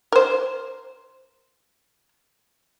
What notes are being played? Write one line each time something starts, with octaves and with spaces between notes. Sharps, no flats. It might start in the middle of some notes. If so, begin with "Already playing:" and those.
A#4 C5